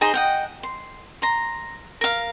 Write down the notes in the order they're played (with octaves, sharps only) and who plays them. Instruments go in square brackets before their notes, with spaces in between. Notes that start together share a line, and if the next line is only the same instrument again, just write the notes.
[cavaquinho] D#4 G#4 C5 A#5
D#5 F#5 G5
C6
A#5 C6
A#4 F5